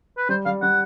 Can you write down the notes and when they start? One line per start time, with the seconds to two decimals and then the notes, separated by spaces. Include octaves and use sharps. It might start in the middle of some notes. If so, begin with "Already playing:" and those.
0.17 B4
0.29 G3 C5
0.45 G3 F5
0.62 G3 F#5